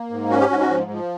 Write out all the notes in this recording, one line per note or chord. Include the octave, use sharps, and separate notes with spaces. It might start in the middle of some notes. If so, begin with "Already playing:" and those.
Already playing: A#3
G#2
C#4 F#4
G4
G#2 F#4
F#4
F3
F3